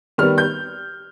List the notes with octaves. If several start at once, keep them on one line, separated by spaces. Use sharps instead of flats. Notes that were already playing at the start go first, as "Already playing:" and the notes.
D#3 G3 B3 F6
G6